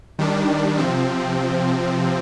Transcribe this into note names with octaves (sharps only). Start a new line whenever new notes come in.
D#3 G3 D4
C3 F3 C4